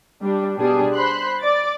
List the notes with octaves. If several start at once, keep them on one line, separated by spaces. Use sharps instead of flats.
G3 D4
B2 G3 D4 G#4
C5 B5 C6 F#6
D5 D6 A6